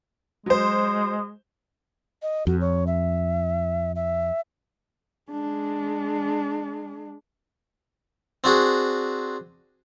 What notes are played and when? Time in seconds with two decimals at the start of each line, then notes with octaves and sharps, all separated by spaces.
0.46 F#3 G#3 C5
2.22 D#5
2.47 F2 F#4
2.61 C#5
2.87 E5
3.96 E5
5.31 G#3 D4
8.44 C4 D4 F#4 G#4